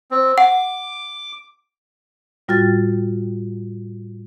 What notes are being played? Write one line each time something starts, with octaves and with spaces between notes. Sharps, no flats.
C4
F#5 D6
A2 G3 F4 F#4 G5 A6